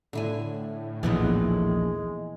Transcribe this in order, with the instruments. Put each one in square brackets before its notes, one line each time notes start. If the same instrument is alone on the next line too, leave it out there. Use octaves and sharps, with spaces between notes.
[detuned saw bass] A2 [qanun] D3 E4 G#5
[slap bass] A#1 D#2 [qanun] E3 B3 E4 [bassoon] G#3